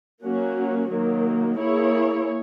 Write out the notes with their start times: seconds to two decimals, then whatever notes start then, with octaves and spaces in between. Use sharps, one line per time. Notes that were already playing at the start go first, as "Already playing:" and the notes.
0.23 F#3 A#3 C#4 F#4
0.91 D#3 F#3 A#3
1.59 A#3 E4 G#4 C#5